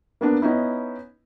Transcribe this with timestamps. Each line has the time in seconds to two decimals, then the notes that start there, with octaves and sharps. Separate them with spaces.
0.21 A#3 B3 D4
0.42 B3 C#4 D#4 E4